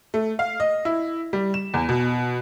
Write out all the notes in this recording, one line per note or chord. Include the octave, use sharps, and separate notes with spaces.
A3
F5
D#5
E4
G3
E7
E2
B2